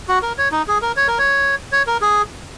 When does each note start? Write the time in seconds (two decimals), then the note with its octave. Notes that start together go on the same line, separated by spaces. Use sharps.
0.08 F#4
0.22 A#4
0.38 C#5
0.52 D#4
0.68 G#4
0.82 A#4
0.97 C#5
1.08 A#4
1.18 C#5
1.72 C#5
1.87 A#4
2.01 G#4